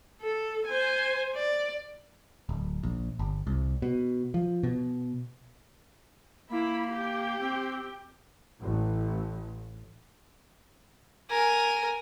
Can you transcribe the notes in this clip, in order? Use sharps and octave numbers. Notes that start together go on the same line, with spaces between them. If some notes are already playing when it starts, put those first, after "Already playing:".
A4
C5 G#5
D5
D1
A#1
G1
C2
B2
F3
B2
A#3 E4 B5
G4 G5
C4
A1
A#4 G#5